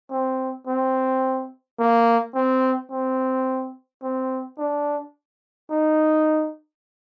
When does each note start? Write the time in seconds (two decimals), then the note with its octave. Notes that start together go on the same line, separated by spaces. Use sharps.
0.11 C4
0.67 C4
1.79 A#3
2.34 C4
2.91 C4
4.03 C4
4.58 D4
5.70 D#4